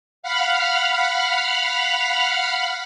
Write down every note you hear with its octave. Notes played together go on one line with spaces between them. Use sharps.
F5 F#5 B5 F6